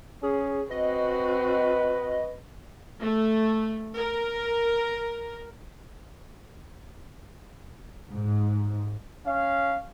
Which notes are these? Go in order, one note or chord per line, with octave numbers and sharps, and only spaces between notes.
C#4 G#4
C4 F#4 B4 D#5
A3
A#4
G#2
C#4 F5